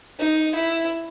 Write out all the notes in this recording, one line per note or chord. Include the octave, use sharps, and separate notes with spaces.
D#4
E4